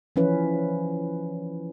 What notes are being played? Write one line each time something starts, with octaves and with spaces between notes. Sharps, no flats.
E3 F3 C#4 E4 B4